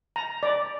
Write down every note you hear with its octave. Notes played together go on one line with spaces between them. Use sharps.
A#5
D5